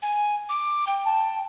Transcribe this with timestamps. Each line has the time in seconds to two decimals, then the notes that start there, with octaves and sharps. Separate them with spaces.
0.02 G#5
0.49 D6
0.87 G5
1.05 A5